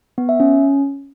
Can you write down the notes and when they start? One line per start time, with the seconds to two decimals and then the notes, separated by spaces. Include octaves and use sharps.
0.18 B3
0.29 E5
0.40 C#4